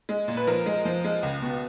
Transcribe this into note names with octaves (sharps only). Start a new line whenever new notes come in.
G#3
A#2
B4
F3 A#4
G#3
F3
G#3
C#2
B2